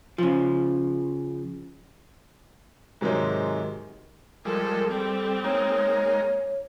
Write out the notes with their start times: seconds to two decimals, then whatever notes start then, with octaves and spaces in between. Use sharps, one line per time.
0.18 C#3 F3
3.01 G#2 C3 D#3 F#3 G#3
4.45 F3 G3 G#3 A4 A#4
4.91 G3 C4 A4
5.44 G#3 A#3 D#4 C#5